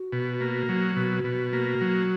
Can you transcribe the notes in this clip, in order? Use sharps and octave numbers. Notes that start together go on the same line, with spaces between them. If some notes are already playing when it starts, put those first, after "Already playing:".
Already playing: F#4
B2
A#3
F#3
B2
B2
A#3
F#3